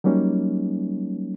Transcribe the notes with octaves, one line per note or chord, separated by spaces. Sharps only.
F#3 G3 A#3 C#4 D#4